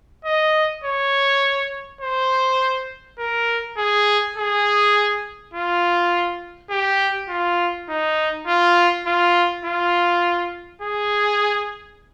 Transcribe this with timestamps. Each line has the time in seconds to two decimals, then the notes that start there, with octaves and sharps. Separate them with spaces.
0.25 D#5
0.84 C#5
2.01 C5
3.19 A#4
3.77 G#4
4.36 G#4
5.54 F4
6.71 G4
7.29 F4
7.89 D#4
8.47 F4
9.06 F4
9.65 F4
10.82 G#4